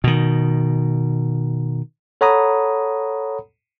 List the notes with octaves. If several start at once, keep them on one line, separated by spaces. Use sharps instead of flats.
B2 D#3
A4 C#5 F#5 A#5 B5 D#6